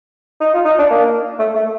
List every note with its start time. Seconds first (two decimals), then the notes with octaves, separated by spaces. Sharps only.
0.41 D#4
0.54 F4
0.65 D#4
0.79 D4
0.91 A#3
1.39 A3
1.55 A3